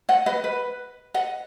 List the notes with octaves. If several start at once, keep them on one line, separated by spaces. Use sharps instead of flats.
D#5 F#5
B4 D#5
B4
D#5 F#5